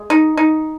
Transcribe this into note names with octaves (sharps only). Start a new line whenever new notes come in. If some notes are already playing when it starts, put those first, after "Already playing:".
Already playing: G#3
D#4
D#4